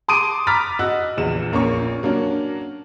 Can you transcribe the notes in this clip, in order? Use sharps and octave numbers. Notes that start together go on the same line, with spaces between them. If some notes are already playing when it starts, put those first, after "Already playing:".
A5 C6 D6 D#6 D7 D#7
A#5 B5 D6 F6 A6 B6
F#4 D#5 E6 F#6
A#1 E2 E7
A#1 A#3 C#4 C#6
F#3 A#3 C#4 D4